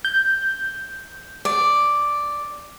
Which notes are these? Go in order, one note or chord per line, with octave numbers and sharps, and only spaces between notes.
G6
D5